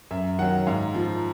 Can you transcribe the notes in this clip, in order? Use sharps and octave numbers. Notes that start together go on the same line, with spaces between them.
F#2 E5
D#3 F#3 F#5
G#2 F5
F3